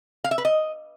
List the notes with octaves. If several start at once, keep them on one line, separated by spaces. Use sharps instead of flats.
F5
E5
B4
D#5